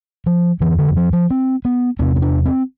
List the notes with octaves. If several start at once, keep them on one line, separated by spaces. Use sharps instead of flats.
F3
F2 D3 E3
D3
E3
F3
F3
C4
B3
E2 C3 C4
C4
D4
C4